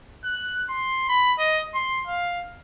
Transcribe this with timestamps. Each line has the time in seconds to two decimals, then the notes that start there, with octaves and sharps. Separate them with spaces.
0.24 F#6
0.69 C6
1.09 B5
1.39 D#5
1.75 C6
2.07 F5